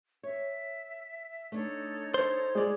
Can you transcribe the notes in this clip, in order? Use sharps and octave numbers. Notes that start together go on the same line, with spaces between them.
C#5 E5
A3 D4 D#4 A4 C#5
C5
G#3 D5